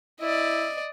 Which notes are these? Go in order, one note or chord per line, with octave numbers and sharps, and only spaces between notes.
E4 D5 D#5